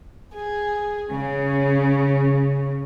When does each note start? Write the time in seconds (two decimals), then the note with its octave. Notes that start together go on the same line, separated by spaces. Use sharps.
0.33 G#4
1.13 C#3